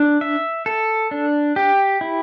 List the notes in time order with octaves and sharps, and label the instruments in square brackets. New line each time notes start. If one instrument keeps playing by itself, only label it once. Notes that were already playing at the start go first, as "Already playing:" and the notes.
Already playing: [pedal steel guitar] D4
E5
A4
D4
G4
E4